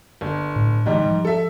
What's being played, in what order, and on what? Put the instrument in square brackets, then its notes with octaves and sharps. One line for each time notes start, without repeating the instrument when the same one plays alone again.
[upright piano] G1
[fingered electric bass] A2
[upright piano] G#2 G3 D#4 [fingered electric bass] D3 E3 G#3
[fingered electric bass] F3
[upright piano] A4 E5